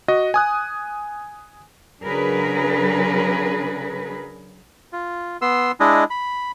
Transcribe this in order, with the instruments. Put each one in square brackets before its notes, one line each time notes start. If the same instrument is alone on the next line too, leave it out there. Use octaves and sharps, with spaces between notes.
[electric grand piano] F#4 D#5
G#5 D#6 F#6
[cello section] C#3 F#3 D4 G#4 A#4 B4
[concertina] F4
B3 C6 E6
G#3 D4 E4 D#5
B5